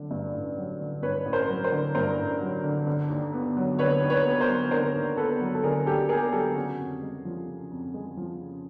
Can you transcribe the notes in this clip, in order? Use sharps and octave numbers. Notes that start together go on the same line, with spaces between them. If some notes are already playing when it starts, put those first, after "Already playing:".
Already playing: D3 F#3
G2
A1
F#3
D3
G2 B4 C#5
A1
A#4 C5
F#3
A#4 C5
D3
G2 A#4 C5
A1
F#3
D3
D3
D#2
B3
F#3
D3 B4 C#5
D#2
B4 C#5
B3
A#4 C5
F#3
D3 A#4 C5
D#2
B3 A4 B4
F#3
A4
D3 G#4 A#4
D#2 G4 A4
B3 G#4 A#4
F#3 G4 A4
C#3 F#4 G#4
F2
G#3
F3
C#3
F2
G#3
F3
C#3